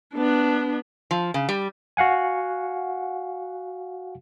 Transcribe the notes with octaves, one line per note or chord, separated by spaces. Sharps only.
B3 D4
F3
C#3
G3
F#4 F5 F#5 G#5